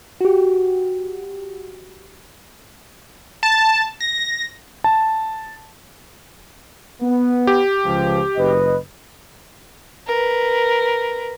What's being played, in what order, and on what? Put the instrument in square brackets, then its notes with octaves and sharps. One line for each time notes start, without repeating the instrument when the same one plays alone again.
[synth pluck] F#4 G4
[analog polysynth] A5
A#6
[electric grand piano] A5
[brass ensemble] B3
[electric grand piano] G4
[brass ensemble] C#2 F3
F#1 B4 D#5
[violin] A#4 B4